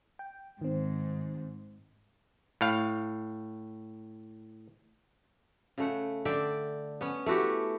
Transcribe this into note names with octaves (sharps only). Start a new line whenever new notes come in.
G5
G#2 D#3 C4
A2 F5
C#3 A3 F#5
D3 D5 E5 G5
B3 C#4
A3 E4 F#4 G4